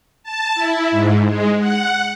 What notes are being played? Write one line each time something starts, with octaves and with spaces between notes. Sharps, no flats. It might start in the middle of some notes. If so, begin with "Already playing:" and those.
A5
E4
G#2
G#3
F#5